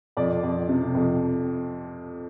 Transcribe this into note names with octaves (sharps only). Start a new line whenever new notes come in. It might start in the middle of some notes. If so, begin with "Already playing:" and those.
F2 D5
F2
C3
F2